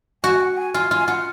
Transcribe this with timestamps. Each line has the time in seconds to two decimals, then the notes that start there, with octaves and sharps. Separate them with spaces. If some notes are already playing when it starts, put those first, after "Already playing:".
0.24 F#4 G#5
0.41 F#5
0.57 G#5
0.74 F4 G#5
0.90 F4 G#5
1.07 F4 F#5